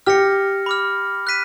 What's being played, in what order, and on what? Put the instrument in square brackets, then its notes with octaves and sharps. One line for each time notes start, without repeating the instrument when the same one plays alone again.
[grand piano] G4 [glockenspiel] F6 A#6 C#7
[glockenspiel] B5 D6 F6
F#6 B6 D#7